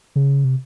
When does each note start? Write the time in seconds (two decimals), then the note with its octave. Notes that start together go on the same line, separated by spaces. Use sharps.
0.16 C#3
0.44 C3